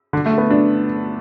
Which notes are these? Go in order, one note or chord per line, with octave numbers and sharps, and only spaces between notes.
D3
A3
B3
D4